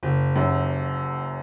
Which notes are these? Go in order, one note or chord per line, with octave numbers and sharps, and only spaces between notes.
F#1
F#2 F#3